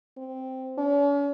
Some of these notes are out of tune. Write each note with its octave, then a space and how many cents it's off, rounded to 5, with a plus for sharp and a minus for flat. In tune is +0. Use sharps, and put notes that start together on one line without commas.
C4 -5
C#4 +45